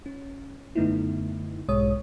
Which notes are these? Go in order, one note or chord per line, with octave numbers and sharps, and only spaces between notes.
C#4
F#2 D3 A3 B3 D#4 E4
B1 G#2 B2 G#3 C#5 D#6